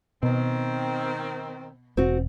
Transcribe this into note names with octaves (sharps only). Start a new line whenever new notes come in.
B2 D#3 C4
E1 C4 F#4